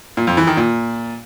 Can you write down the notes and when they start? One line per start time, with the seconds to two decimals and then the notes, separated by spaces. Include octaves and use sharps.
0.17 A#2
0.27 F2
0.37 E3
0.47 D#3
0.57 A#2